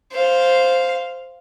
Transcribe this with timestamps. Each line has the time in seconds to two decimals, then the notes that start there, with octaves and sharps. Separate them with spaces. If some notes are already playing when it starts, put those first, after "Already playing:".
0.12 C5 F5